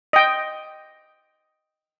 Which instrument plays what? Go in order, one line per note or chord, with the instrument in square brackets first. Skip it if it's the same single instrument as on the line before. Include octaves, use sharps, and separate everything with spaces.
[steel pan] D#5 G5